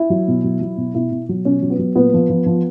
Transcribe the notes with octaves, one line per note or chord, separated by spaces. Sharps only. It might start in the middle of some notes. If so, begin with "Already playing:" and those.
Already playing: E4
F#3
B2
F#3
F#3
B2
B2 E4
B2
F#3
B2 C#4
F#3
B3
F#3
A#2 B3
F3
F3
F3